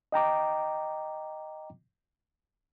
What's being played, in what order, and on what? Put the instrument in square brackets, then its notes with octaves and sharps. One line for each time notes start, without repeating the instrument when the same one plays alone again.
[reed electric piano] D#5 G5 A#5 D6